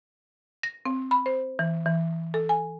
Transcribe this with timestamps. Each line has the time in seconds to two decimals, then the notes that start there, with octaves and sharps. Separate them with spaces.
0.63 A#6
0.85 C4
1.11 B5
1.26 C5
1.59 E3
1.86 E3
2.34 A4
2.49 G#5